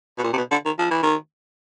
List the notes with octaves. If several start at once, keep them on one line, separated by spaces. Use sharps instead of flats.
B2
A#2
C3
B2
D3
D#3
F3
E3
D#3